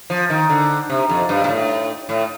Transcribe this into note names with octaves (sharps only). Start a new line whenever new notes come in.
F3
D#3
D3
C3
F2
G2
A#2
A2
A2